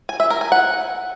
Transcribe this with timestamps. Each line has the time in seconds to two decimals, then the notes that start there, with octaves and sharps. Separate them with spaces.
0.09 G#5
0.20 E5
0.30 A#4
0.41 G#5
0.52 F#5